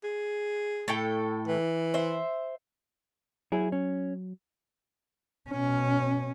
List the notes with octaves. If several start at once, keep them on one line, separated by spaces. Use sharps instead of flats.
G#4
A2 A4 G5
E3
C5 E5
F#3 E4 G#4
C#4
B2 C#4